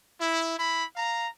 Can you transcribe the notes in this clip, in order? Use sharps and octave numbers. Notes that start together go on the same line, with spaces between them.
E4
E4 B5
F5 A#5